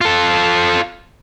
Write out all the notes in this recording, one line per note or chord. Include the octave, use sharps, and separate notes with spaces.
F4 A4